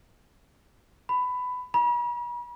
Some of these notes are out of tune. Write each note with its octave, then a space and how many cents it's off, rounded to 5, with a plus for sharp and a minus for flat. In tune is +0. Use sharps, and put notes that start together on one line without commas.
B5 +15
B5 -45